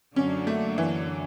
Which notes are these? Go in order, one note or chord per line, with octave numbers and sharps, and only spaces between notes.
F#2 D3 F#3 A#3 C#4 D4
A3
E3